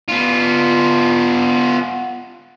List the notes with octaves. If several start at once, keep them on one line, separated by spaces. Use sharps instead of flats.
B3 F4